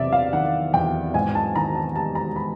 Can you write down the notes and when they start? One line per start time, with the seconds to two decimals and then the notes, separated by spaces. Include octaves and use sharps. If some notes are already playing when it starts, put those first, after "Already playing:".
Already playing: E2 C3 D5 E5
0.13 F5
0.33 D#3 F#5
0.73 E2 G5
1.14 G#2 G#5
1.35 A5
1.56 D#3 A#5
1.75 A5
1.96 G3 A5
2.15 A#5
2.36 B5